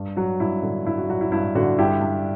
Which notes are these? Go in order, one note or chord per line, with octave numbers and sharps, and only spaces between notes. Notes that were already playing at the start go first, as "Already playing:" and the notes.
Already playing: G2
F#3 F#4
G2 E4
D3
G2 E4
F#4
F#3 F#4
E4
G2 E4
D3 F#4
G2 E4 G4
G2